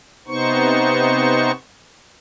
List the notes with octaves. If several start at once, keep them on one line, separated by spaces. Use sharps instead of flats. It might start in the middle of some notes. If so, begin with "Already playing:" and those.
C3 B3 D#4 C5 C#6